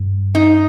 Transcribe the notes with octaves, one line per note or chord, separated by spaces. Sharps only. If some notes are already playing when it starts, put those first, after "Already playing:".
Already playing: G2
D#4